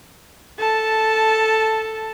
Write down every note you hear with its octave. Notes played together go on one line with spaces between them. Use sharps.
A4 A5